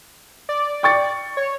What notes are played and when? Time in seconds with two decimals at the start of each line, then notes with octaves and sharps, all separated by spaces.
0.49 D5
0.83 G5 C#6 A6
1.37 C#5